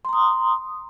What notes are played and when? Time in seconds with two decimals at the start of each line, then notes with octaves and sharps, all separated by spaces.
0.05 C6
0.09 A#5
0.13 D#6